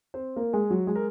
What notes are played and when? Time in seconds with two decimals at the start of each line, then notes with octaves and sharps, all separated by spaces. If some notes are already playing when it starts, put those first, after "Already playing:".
0.14 C4 C5
0.36 A#3 A#4
0.53 G#3 G#4
0.70 F#3 F#4
0.87 G#3 G#4
0.95 A#4